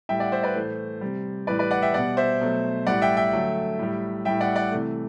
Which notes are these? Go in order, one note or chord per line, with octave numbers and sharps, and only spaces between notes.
A2 G3 E5 G5
D5 F#5
C5 E5
B4 D5
A2 E3 A3 C5
C3 G3
A2 E3 G3 B4 D5
B4 D5
D5 F#5
E5 G5
B2 G3 D5 F#5
C5 E5
B2 F#3 A3
A2 G3 D5 F#5
E5 G5
E5 G5
D3 F#3 A3
A2 G3
A2 G3 E5 G5
D5 F#5
D5 F#5
C3 E3 A3